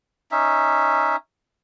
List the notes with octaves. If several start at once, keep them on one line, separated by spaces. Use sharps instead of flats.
C#4 D#4 E5